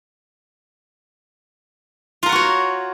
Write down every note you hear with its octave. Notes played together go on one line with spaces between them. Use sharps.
F4 F#4 A#4 C#5 F#5